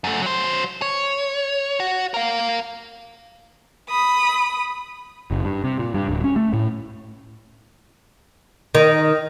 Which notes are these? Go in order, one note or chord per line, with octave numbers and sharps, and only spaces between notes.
F#2 A3
F#3 C5
C#5
F#4
A#4 F5
B5 D#6
F#1
G2
C3
A#2
G2
D1
C#4
A3
A2
D#3